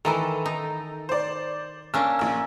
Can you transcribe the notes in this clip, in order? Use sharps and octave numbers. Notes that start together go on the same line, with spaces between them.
D#3 E3 E4 A4 A#5
D#4
C5 D5
A#3 C#4 D4 E6
A#1 E6